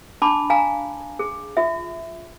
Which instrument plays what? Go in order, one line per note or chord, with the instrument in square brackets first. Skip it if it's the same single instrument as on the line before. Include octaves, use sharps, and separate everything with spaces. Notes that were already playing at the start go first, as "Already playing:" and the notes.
[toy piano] D4 A5 B5 D6
F5 G#5 A#5
G#4
F4 E5